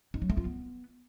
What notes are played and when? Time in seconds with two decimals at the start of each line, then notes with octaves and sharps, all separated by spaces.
0.14 D#4
0.22 F#3
0.30 A3
0.37 F4
0.45 B3